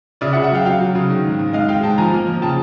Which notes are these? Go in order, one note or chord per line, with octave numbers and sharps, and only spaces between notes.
C#3 D5 E5
E5 F#5
C#3
E5 F#5
F#3 F5 G5
F#3 F5 G5
F#3
C#3
D#3
G#2
G#2
G#2 D#5 F5
G#3 F5 G5
G#2 G5 A5
F3 G#5 A#5
A#3
F3
C#3 G5 A5